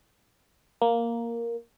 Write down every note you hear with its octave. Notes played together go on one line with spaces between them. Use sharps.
A#3